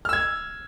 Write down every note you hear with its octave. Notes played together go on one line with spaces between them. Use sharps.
E6 F6 G#6